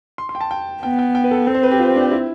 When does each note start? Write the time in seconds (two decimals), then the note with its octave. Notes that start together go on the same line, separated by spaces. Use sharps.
0.18 C6
0.29 C6
0.35 G5
0.41 A5
0.51 G5
0.83 B3 G5
0.99 G5
1.15 G5
1.24 B4
1.31 A4
1.47 C4 A4
1.55 C5
1.63 B4
1.71 G4
1.79 F4
1.96 D4
2.11 E4